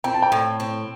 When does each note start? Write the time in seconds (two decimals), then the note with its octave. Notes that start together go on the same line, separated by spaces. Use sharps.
0.04 C4 G5
0.14 A5
0.22 G5
0.32 A2
0.60 C4